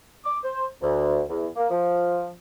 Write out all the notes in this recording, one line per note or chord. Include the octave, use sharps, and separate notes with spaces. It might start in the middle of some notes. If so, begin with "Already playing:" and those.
D6
C5
D2
E2
A#3
F3